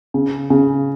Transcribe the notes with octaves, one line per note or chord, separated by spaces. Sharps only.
C#3
C#3